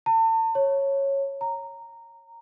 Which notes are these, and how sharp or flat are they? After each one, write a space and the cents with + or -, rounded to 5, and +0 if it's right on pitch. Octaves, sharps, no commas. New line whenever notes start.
A5 +40
C#5 -10
A#5 -10